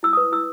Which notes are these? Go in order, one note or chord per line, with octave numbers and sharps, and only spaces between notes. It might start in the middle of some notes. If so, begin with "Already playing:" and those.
E4 E6
D#6
B4
E4 E6